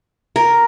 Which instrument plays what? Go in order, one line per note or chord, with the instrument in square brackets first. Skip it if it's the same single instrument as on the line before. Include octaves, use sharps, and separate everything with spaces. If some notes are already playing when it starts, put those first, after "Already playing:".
[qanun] A#4